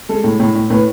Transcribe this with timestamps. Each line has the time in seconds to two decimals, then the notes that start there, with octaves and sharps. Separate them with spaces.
0.09 G#3 A4
0.24 A2
0.40 A2
0.55 A2
0.70 A2 B4